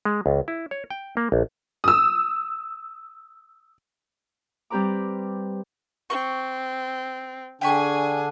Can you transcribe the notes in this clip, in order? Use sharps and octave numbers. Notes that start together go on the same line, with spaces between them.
G#3
C#2
E4
C#5
G5
A#3
A#1
D#6 E6
G3 C4 G4 B4 A#5 D6
C4 C#6
D3 D4 G#4 G5 G#5 B5 C#6